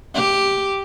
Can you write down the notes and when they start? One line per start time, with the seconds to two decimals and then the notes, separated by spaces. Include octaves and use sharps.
0.15 G4